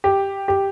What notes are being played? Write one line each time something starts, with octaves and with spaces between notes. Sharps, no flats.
G4
G4